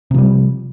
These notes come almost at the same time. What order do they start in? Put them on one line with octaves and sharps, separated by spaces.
C3 F3 G3